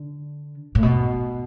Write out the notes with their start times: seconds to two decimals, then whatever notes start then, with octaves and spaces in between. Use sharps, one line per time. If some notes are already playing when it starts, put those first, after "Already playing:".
Already playing: D3
0.75 A2
0.83 B2